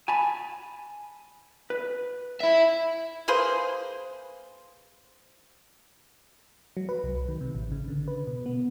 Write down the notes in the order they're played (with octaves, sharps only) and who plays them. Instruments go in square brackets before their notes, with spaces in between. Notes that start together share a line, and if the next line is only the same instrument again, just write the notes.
[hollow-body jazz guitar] G#5 A5 B5
B4
[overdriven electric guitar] E4 E5
[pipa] A#3 G#4 B4 C5
[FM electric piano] F#3
B4
C2
D#3
C3
A1
C#3
D3
B4
B2
B3